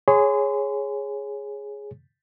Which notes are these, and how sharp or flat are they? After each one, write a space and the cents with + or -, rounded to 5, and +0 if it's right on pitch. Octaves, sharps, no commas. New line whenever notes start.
G#4 +0 C#5 -5 C6 -35